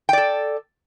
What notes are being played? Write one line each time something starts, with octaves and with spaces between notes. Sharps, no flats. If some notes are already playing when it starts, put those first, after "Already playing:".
A4 D5 G5